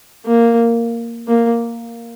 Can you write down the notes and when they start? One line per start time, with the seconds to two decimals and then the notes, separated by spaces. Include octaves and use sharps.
0.26 A#3
1.28 A#3